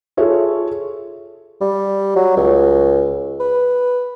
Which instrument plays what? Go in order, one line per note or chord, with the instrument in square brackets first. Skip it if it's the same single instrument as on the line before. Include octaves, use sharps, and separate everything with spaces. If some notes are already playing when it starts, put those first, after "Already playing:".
[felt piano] F4 G#4 A4 C#5 E5
[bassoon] G3
F#3
C#2
B4